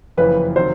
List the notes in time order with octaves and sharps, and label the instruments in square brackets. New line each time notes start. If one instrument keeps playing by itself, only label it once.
[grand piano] F#1 F2 C#3 E3 [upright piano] B4
[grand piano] C3 D#3 F#3 [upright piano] C5